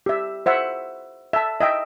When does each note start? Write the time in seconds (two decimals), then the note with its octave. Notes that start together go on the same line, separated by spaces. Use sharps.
0.06 G4 E5
0.46 C5 E5 F#5
1.33 E5 A5
1.60 D#5 E5 G5